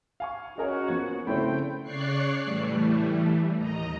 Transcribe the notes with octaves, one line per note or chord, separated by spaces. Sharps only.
F5 G#5 C#6
C#4 F#4 G#4 A#4 C#5 D#5 G#5
F3 A#3 B3 G#6
C#3 A3 C4 E4 C5 G5 B5
C#3 C#5 D5 C#6 F#6 C7
A2 E3 G3 A3
D#2 D#5 A#5